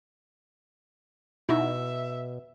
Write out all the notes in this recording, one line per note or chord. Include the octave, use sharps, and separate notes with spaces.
B2 D#4 E4 F#4 E5